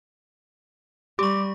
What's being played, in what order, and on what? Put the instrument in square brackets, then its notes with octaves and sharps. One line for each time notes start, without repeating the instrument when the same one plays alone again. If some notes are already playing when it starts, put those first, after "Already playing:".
[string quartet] G3 [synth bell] G4 C#6 [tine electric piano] D6